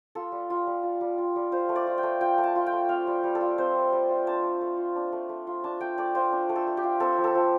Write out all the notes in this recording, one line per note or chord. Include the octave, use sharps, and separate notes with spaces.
F4 A4
G3
F4
G3
F4
G3
F4
G3
F4 C5
A3
D5
F4
G5
A3
F4 G5
A3
A5
F4
G5
A3
C4 F5
G3
G3
A4
F4
C4 C5
G3
G3
F4
D4 A5
A3
A3
F4
D4
A3
A3
F4
D4 A5
A3 G5
A3 D5
F4 C5
D4
A3
A4
A3
G4
F4
C4 A4
F3
A4
F3